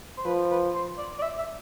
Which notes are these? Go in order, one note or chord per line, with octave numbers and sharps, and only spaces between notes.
C5
F3 B4
B4
C5
D5
D5
E5
E5